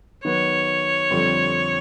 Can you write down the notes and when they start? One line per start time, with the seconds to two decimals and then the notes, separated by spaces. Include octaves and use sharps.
0.25 D#3 F#3 B3 C#5
1.10 F2 D3 G3 C4 F4